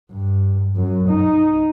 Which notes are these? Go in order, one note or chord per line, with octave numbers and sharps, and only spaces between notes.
G2
F#2
D#4